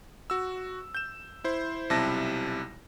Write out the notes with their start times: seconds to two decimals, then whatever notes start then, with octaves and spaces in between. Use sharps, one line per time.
0.30 F#4 E6
0.95 G6 E7
1.44 E4 C5
1.90 B1 C3 G3 E4 A5 A#6